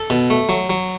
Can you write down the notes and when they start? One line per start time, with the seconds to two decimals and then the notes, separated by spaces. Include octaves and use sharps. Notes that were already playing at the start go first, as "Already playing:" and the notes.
Already playing: A4
0.10 B2
0.30 A3
0.49 F#3
0.70 F#3